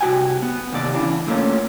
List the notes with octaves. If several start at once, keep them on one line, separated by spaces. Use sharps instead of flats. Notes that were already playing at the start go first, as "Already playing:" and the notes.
C2 F#4 G5 G#5
B3
D#2 C3 D5
C#3 E3 D4
A#2 A3 A#3 C#4